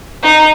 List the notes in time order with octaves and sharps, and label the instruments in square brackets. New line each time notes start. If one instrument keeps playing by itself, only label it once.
[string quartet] D#4